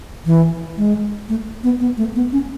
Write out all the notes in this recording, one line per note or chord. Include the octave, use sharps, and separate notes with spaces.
E3
G#3
A3
B3
B3
A3
B3
C#4